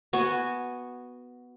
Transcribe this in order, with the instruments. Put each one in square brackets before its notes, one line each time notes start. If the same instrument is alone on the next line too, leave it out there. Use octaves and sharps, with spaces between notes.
[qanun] B3 F#4 G#5